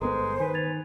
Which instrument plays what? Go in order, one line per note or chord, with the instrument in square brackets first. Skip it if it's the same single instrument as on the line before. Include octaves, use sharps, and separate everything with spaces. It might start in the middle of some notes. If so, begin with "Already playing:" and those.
[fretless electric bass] G1 C3 B3 [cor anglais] G#3 [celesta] A4 A#4 A#5 [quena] C5
[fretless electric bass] D#3 [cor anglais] B4 [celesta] G#5
[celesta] G#6 A6 F7